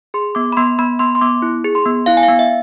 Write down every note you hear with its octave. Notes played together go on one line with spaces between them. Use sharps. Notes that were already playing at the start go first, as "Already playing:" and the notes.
G#4 C6
B3 D6
B5
B3 C6
B3 B5
B3 C6
C6
B3 D6
E4
G#4
C6
B3
E4 F5
G#5
F5
B3
E5